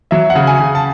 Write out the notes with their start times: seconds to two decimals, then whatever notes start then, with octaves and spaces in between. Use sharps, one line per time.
0.11 F#3 E5
0.30 F#5
0.35 C#3
0.47 G#5
0.60 C#3
0.75 A5